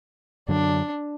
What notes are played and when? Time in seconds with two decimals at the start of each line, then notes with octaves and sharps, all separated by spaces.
0.48 F#2 D3 F#3 D4